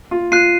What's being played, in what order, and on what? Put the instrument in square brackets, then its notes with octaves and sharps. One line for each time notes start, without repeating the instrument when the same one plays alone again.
[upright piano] F4
[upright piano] F4 [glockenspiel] F#6 C7 D#7